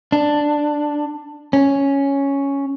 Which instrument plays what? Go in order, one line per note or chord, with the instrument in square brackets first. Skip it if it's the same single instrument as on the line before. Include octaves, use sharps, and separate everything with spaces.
[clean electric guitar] D4
C#4